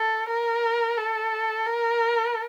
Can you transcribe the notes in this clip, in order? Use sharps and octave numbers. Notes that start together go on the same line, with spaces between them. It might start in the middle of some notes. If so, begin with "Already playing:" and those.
Already playing: A4
A#4
A4
A#4